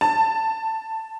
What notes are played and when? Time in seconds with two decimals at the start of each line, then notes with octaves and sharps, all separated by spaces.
0.01 A5